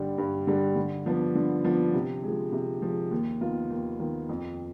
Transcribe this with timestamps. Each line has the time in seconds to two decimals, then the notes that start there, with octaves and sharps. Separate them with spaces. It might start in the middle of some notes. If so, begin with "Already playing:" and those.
Already playing: G2 D3 G3
0.18 G2
0.47 D3 G3
0.76 D3
1.06 F3 B3 D4
1.35 D3
1.64 F3 B3 D4
1.94 C3
2.23 F3 G#3
2.52 C3
2.82 F3 G#3
3.11 D#2
3.41 D#3 B3 F4
3.70 D#2
3.99 D#3 B3 F4
4.29 F2